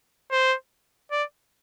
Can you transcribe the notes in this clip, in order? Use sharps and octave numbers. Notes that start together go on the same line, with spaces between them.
C5
D5